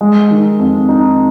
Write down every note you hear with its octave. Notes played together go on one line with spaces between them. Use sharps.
G#3
D#3
F2
D#4